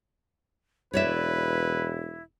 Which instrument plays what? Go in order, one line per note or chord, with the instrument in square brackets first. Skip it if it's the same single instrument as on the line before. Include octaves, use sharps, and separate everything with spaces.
[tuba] E1 [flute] E4 [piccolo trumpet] B4 [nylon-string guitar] C#5 D5 E5